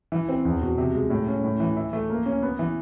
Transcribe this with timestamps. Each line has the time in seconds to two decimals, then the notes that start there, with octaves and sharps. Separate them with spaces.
0.12 E3
0.29 C4
0.45 E2
0.62 B2
0.78 C3
0.94 G#3
1.10 A2
1.28 C#4
1.44 A2
1.60 E3
1.77 E4
1.93 A3
2.10 A#3
2.26 C#4
2.42 B3
2.59 E3